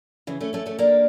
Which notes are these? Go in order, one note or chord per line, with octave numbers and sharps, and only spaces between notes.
C#3 E3
A3 C#4
A3 C#4
A3 C#4
A#3 D4